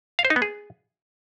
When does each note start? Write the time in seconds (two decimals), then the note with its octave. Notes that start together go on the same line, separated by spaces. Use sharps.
0.19 F5
0.25 C5
0.30 D#4
0.36 B3
0.42 G#4